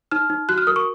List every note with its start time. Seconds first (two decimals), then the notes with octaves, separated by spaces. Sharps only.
0.11 D#4 F6
0.30 D#4
0.49 F#4 F#6
0.58 F6
0.67 A#4 D#6
0.76 C#6